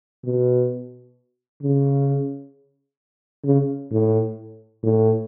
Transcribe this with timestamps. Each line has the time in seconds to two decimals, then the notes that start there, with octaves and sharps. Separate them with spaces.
0.25 B2
1.63 C#3
3.45 C#3
3.92 A2
4.83 A2